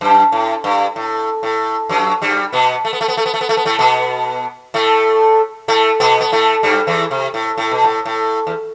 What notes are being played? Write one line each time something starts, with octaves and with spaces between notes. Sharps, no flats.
F#2
A2
G2
A2
A2
F#2 F#3
G2 G3
B2 B3
A3
B3
A3
B3
A3
B3
A3
B3
A3
B3
A2 A3
B2 B3
A2 A3
A2 A3
B2 B3
B3
A2 A3
G2 G3
E2 E3
C3
A2
A2
B2
A2
A2
E2